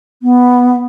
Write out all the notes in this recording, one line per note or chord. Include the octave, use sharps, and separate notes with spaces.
B3